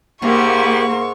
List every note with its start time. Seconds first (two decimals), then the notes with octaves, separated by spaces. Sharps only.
0.22 G#2 A#3 B3 E4 G4 C#6